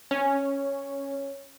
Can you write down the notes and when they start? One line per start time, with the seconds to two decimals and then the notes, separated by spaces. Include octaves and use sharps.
0.11 C#4